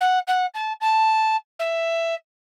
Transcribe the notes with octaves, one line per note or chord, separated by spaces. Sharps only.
F#5
F#5
A5
A5
E5